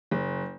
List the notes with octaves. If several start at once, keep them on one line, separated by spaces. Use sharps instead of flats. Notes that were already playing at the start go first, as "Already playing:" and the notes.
F#1